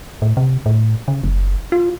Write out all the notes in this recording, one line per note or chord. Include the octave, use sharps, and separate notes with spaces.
A2
C3
A2
C#3
F#1
F4